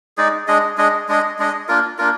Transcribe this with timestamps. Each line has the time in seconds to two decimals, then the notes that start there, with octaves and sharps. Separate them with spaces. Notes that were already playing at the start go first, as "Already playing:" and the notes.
0.17 G#3 D#4 G#4 D5
0.47 G#3 D4 G#4 D#5
0.77 G#3 D4 G#4 D#5
1.08 G#3 D4 G#4 D#5
1.39 G#3 D4 G#4 D#5
1.68 A#3 D4 F4 A#4
1.98 A#3 D4 F4 A#4